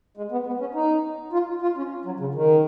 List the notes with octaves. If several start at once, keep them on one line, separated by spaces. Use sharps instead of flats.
G#3
B3
B3
C#4
D#4
F4
F4
C#4
F#3
C#3
D#3